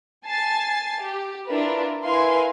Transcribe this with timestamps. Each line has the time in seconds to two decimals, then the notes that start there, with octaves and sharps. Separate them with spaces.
0.25 G#5 A5 A6 C7
1.01 G4
1.48 D4 E4 F4 A#4 B4
2.03 E4 A#4 B4 F5 G#5 C6